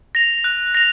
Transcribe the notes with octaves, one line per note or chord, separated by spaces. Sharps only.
A#6 F7
F#6
A#6 F7